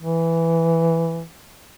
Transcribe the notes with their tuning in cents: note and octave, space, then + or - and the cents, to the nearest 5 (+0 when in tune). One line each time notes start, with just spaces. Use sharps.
E3 +5